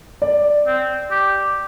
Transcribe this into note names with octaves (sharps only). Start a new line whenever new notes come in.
D5
C4
G4